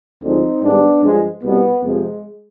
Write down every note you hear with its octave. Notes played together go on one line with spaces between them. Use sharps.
D2 D3 F3 G#3 C4 D#4
G#2 D#3 G3 B3 D4
G2 F3 G#3
C2 B2 G3 B3
F2 C3 F3 G#3